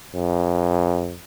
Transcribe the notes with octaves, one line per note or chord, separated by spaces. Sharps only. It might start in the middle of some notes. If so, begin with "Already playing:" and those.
F2